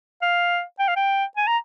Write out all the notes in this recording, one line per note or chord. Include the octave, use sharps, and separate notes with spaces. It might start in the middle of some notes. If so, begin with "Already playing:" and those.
F5
G5
F5
G5
G#5
A#5